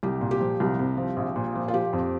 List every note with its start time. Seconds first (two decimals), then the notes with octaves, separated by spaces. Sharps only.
0.03 C2 G4
0.21 A#2
0.31 G4
0.40 F3
0.60 C2
0.79 C3
0.97 F3
1.17 A#1
1.36 A#2
1.55 F3
1.68 F4
1.73 F3 G4
1.93 F2